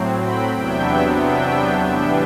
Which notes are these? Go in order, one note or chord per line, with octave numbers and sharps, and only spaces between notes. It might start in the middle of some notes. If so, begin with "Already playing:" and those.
Already playing: A2 F#3 C4
G5 B5
E2 C3 F#3 B3 D4 E5 G5
E5 G5
A2 E3 G3 B3 D4 E5 G5